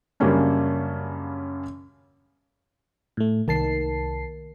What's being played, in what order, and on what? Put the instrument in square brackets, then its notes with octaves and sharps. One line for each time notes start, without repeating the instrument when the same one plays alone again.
[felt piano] F#2 C#3 G3 A#3 C#4 D4
[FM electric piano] A2 A3
[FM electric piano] C2 A5 C7 [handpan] D#3